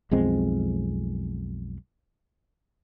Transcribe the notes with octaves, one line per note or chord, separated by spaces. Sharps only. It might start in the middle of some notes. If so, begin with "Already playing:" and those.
B1 F2 G#3 C4